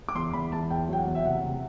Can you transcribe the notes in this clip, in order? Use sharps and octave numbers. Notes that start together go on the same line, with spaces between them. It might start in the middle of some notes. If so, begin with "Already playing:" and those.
D6
E2 C6
E2 B5
E2 A5
E2 G5
F#3 G5
F#5
E2
E5
C3 F#5
C3